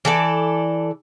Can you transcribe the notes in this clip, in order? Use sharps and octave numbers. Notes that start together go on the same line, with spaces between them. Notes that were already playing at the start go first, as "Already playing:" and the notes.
E3 A4 D5